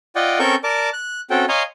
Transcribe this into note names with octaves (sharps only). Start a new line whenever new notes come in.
F4 D5 D#5 F#5 G5
C4 C#4 A4 A#4 C#6 G6
A#4 D5 A5 D6
F#6
C4 C#4 F#4 A4 G5
C#5 D#5 F5 G#5 A#5 C6